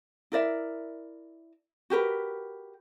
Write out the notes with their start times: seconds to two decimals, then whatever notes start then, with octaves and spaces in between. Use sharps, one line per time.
0.32 E4 A#4 D5 E5
1.90 F#4 G4 A#4 B4